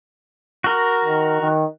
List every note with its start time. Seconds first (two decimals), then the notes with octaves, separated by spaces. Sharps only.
0.64 F#4 A#4
1.05 D#3
1.41 D#3